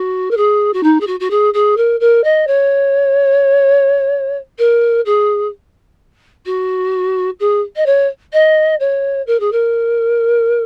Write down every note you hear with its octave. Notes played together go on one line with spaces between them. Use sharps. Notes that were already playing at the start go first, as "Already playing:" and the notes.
Already playing: F#4
A#4
G#4
F#4
D#4
G#4
F#4
F#4
G#4
G#4
A#4
A#4
D#5
C#5
A#4
G#4
F#4
G#4
D#5
C#5
D#5
C#5
A#4
G#4
A#4